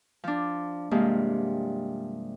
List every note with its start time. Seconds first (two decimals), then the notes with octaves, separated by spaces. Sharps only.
0.24 F3 D4
0.91 G2 C3 F3 G#3 A#3